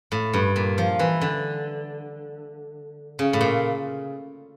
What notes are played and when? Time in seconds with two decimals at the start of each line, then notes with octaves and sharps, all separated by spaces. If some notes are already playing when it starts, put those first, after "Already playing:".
0.12 A2
0.33 G2
0.56 A#2
0.78 F3
0.99 E3
1.21 D3
3.19 C#3
3.33 A2
3.41 A#2